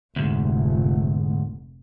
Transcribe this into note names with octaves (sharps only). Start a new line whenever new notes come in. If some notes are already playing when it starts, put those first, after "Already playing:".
F1 D2 G#2